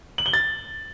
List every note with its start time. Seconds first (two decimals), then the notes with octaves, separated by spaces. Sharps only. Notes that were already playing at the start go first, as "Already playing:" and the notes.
0.18 F#7
0.26 G7
0.33 A6